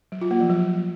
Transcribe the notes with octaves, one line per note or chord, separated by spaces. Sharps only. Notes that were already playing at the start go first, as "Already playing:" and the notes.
F#3
F4
A#3
F3
F#3